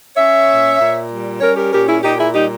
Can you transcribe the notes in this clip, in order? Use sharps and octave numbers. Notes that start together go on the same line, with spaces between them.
C#4 C#5 E5
A#2
A#2
G3
C#4 A#4 C#5
G4 A#4
A#2 G4 A#4
E4 G#4
A#2 D#4 G4
E4 G#4
G3 D#4 G4